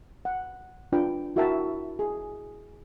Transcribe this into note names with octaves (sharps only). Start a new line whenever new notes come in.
F#5
D4 F4 B4 G5
E4 F#4 A#4 E5 G5 A5
G#4